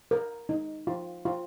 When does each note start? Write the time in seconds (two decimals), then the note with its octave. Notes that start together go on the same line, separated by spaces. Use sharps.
0.11 A#4
0.49 D#4
0.87 F4
1.25 F4